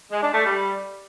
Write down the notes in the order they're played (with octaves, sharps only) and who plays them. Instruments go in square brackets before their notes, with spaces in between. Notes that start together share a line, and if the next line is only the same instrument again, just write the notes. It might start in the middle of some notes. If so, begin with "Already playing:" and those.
[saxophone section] G#3
D4
A3
G3